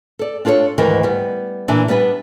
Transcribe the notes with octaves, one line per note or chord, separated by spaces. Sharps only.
A4 D5
D4 F4 A4 C5 C#5
D2 G#2 D#3 E3 A#4
G3 B3
A#2 E3 D4
G3 B3 D4 B4